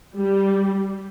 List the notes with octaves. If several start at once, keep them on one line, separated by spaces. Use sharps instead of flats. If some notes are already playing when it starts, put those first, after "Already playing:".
G3